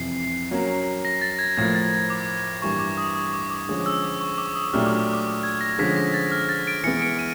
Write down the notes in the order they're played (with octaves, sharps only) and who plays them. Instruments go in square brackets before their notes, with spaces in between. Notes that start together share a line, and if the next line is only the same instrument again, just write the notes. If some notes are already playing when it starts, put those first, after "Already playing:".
Already playing: [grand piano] F2 C3 E3 [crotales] C7
[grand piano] F#3 A#3 C#4
[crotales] A#6
A6
G#6
[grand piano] A2 F3 A#3 [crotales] G#6
[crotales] A6
D6
[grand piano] G2 E3 G3 A#3 [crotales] C#6
[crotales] D6
D#6
D#6
D6
D6
[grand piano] D3 F3 G#3 C#4
[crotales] E6
D6
C#6
D6
D#6
[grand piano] A#2 F#3 A3 D4 G4 [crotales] F6
[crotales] D6
D6
D6
D6
G#6
A#6
[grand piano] D3 F3 G#3 C#4 [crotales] B6
[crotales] A#6
A6
F6
A6
D7
[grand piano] E3 G#3 B3 [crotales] C#7
[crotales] D7
D#7